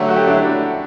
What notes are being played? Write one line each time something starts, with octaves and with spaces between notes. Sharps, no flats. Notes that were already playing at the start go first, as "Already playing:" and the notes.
Already playing: D3 F#3 A3 G4 A4
F#4
G4
D4
E4
D4